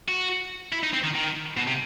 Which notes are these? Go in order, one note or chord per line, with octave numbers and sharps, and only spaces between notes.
F#4
E4
D#4
C4
D#3
D#3
B2
C3